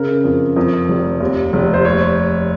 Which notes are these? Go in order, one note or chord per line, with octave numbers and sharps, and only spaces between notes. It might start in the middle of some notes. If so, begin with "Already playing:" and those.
Already playing: C#3 A#4
F2
F2
F1
D#2
F1
C5
C#5